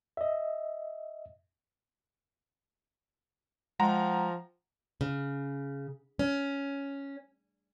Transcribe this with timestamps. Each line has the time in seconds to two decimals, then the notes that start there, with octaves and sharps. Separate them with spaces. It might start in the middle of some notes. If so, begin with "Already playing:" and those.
0.17 D#5 E5
3.80 F3 G#3 F#5 G5 A#5
5.01 C#3
6.19 C#4